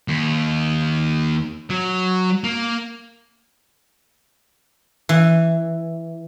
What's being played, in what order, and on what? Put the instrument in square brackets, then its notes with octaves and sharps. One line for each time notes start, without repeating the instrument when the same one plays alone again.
[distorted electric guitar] D#2
F#3
A#3
[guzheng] E3